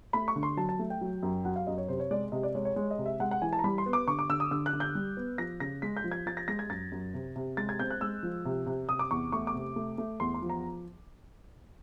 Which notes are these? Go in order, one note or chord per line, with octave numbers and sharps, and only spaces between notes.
A3 B5
C#6
D3
C6
F#3 A5
A5
A3
G5
F#3
F#2
F#3 F#5
F5
F#2 D#5
C#5
C3 C5
C#5
G#3 D5
C3 D#5
D5
G#3 C#5
C#5
G#3 C#5
D#5
C3
E5
G#3 F#5
F#5
E3 G#5
A5
A#5
G3 B5
C6
B3
D6
D3 C#6
D6
D3 E6
D#6
D3 E6
F#6
D3
G6
G3
B3
F3 A#6
C#3 A#6
G#3 B6
G6
F3
G#6
F3 A6
A#6
G#3 A#6
G#6
F#2 A6
F#2
C3
C3
G#3 A6
G#6
C4 G6
F#6
G#3 E6
F3
C3
C3
C3 D#6
D6
E2 C#6
A3 C#6
D6
C3
A3
A3
E2 C6
C6
F3
A#5